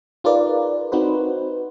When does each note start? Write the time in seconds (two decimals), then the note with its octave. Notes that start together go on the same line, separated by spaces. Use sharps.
0.24 D#4 F4 G#4 A#4 B4 D5
0.92 C4 D#4 F#4 B4 C5